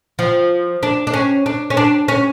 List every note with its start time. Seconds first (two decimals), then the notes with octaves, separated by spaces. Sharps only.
0.19 F3
0.83 D4
1.07 D4
1.13 C#4
1.46 D4
1.70 C#4
1.77 D4
2.08 C#4